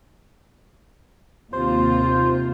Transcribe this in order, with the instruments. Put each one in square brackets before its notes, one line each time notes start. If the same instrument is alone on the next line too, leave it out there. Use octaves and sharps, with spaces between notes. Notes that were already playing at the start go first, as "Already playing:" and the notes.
[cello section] D#2 C3 F4 [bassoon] C5